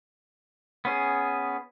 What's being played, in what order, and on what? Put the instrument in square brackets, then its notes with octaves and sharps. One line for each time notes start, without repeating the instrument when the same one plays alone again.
[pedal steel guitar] B3 C#4 G#4